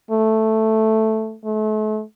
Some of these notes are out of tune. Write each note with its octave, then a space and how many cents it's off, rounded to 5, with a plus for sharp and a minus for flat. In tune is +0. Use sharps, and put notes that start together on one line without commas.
A3 +0
A3 -35